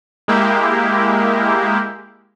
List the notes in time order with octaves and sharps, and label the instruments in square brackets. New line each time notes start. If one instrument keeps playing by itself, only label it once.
[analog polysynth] G#3 A#3 E4 G4